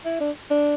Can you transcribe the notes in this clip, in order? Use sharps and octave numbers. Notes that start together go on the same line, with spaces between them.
E4
D4
D4